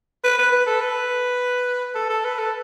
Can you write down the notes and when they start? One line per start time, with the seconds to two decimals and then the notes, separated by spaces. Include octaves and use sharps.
0.24 B4
0.38 B4
0.52 B4
0.66 A4
0.81 B4
1.95 A4
2.10 A4
2.24 B4
2.38 A4